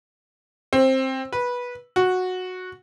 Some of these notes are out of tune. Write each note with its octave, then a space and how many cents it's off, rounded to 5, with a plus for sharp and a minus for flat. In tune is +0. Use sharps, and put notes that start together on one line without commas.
C4 +15
B4 -15
F#4 -10